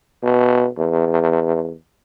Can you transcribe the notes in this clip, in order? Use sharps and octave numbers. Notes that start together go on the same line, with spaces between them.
B2
E2